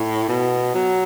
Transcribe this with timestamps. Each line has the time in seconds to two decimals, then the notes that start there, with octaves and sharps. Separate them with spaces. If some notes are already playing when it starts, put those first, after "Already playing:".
Already playing: A2
0.28 B2
0.75 F#3